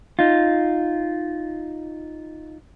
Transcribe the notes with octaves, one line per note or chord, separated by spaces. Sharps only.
D#4 F4